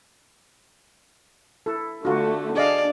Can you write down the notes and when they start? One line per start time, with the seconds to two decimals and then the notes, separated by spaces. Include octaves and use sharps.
1.66 E4 A4
2.05 D3 A3 F4 F#4
2.56 D4 G#4 D5 D#5 F5